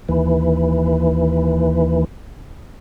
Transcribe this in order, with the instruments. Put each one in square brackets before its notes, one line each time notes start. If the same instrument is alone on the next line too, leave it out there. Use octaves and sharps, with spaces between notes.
[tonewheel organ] D#2 E3